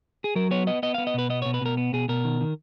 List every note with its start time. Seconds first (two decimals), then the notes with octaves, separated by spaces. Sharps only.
0.24 G#4
0.36 F#3 A#4
0.51 B3 C#5
0.67 B3 D#5
0.83 B3 D#5
0.94 F5
0.98 B3
1.07 D#5
1.14 B2 B4
1.30 B3 D#5
1.42 C#5
1.46 B2
1.54 B4
1.62 B2 A#4
1.77 B3
1.93 B2 G#4
2.09 B2 A#4
2.25 D#3
2.41 D#3